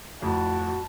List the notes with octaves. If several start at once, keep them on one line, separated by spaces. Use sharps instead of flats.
F2 A2 F#4 A5